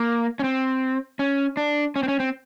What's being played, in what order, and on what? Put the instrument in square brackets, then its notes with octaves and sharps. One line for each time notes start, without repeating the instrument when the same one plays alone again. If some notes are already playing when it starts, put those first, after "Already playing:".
Already playing: [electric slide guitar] A#3
C#4
C4
C#4
D4
C#4
C4
C#4
C4